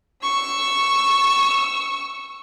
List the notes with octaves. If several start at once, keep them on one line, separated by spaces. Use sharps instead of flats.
C#6 E6